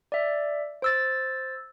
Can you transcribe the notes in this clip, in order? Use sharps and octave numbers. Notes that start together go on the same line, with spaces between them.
D5 E5
C5 E6 A6